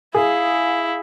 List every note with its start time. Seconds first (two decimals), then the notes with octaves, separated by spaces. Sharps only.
0.14 E4 G#4 F5